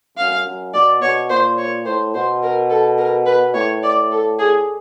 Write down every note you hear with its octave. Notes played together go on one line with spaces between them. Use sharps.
F#2 F5
F#2
B2 D5
B2 C#5
A#2 C5
C#5
A2 C5
B2 C5
A#4
A4
A#4
B4
A2 C#5
D5
A4
G#4